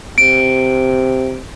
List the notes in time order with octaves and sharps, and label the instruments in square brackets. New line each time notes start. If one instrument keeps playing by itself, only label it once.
[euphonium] C3 [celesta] D7